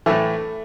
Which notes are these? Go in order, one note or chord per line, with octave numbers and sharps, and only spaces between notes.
A2 E3 A3